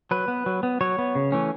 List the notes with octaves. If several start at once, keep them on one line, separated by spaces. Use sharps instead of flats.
F#3 B4
B3
F#3
B3
F#3 C#5
B3
C#3
E3 A3 C#4